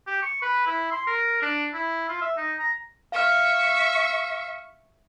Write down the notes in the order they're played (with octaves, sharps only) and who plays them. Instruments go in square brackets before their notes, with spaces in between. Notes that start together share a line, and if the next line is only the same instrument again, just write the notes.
[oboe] G4
C#6
B4
E4
C6
A#4
D4
E4
F4
E5
D#4
A#5
[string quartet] E5 C#6 [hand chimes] F5 F6